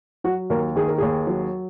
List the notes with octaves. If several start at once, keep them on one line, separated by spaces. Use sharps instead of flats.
F#3 F#4
D#2 A#4
D#3 G#4
A#4
D#2 G#4
F#3